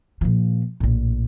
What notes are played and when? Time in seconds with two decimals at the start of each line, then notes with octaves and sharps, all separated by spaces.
0.21 A#2 F3
0.80 A#1 A2